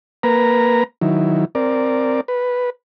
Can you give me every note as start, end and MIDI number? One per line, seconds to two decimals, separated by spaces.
0.23 0.84 58
0.23 0.84 71
0.23 0.84 82
1.01 1.45 51
1.01 1.45 54
1.01 1.45 64
1.55 2.21 60
1.55 2.21 70
1.55 2.21 74
2.28 2.70 71